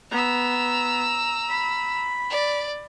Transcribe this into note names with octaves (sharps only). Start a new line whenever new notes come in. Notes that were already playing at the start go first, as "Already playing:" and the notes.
B3 A#5 E6
B5
D5